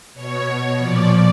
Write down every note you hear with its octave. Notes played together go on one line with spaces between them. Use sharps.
B2 C#5
C#5
A#2 F3 D5